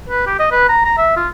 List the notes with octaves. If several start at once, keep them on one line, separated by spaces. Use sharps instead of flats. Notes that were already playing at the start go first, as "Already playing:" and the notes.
B4
G4
D#5
B4
A#5
A#5
E5
F4